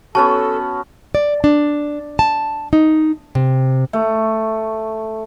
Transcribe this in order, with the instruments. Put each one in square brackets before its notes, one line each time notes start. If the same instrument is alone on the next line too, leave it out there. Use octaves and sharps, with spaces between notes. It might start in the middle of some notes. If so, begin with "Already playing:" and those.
[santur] B3 C#4 F#4 [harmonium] A4 [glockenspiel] A5
[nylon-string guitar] D5
D4
A5
D#4
C3
[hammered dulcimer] A3